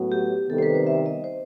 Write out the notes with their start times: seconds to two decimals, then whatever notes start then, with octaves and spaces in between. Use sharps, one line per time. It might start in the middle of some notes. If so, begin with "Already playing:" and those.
Already playing: A2 F#3 B3 F#4
0.12 G4
0.49 C3 D#3 G3 B3 A4
0.58 C5
0.63 B4
0.75 C5
0.87 E5
1.06 D#5
1.24 C5